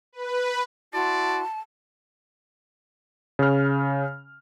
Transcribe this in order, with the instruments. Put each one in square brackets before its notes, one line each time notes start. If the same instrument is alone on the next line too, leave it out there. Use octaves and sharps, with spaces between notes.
[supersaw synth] B4
[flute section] E4 F#4 C6 [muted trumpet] D5 [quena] A5
[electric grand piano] C#3 F6